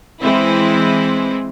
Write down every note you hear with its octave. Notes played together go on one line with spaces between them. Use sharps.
E3 G#3 C4 E4